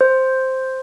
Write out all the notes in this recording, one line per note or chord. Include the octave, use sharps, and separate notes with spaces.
C5